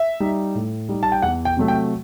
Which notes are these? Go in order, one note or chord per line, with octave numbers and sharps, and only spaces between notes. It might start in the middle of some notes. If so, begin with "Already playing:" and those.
Already playing: E5
G3 D#4
A2
G3 D#4
A5
G5
E2 F#5
G5
C3 F#3 A3
G5